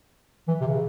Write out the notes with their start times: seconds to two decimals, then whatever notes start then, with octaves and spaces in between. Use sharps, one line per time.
0.48 E3
0.61 C3
0.67 C#3